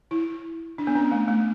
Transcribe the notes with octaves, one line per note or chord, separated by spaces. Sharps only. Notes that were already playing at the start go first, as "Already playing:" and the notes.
E4
D4
B3
C#4
A3
A3